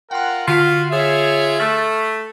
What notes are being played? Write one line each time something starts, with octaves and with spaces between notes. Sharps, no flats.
F4 A#4 F#5 G5 C6
D3 F4 F#4 B6
F4 G#4 C#5 E5
A3 F6 A6 F#7